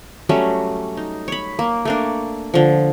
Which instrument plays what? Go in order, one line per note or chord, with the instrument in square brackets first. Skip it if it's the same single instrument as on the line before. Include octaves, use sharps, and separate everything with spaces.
[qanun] F#3 G3 A3 C#4
D#4
C#5 B5
A#3
A3 A#3 D4
D3 F3